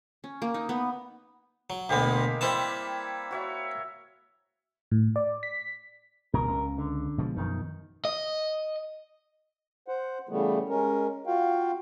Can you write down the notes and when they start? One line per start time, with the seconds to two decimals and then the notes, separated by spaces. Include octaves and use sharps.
0.24 C#4
0.42 A#3
0.54 D#4
0.69 B3
1.70 F#3
1.89 D2 B2 G#3 A#3 B3 G4
2.41 G3 C4 E4 B4 A5
3.31 F#4 C#5 E5
4.91 A2
5.16 D5
5.43 B6
6.34 C#2 B2 A#4
6.47 C#2 C#4
6.78 D3
7.18 B2 F3 G#3
7.37 F#2 B2 D#3 F3
8.05 D#5
9.88 C5 F#5
10.29 C#3 E3 G3 A3 B3
10.69 G#3 C#4 A#4
11.27 F4 F#4 F5 G5